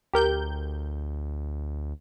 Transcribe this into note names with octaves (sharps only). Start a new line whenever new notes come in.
D2 G4 A#4 G6